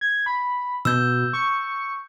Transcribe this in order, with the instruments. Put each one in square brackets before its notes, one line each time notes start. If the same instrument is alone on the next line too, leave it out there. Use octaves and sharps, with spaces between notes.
[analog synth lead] G#6
B5
[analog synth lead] B2 [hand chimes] E6 G6
[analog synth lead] C#6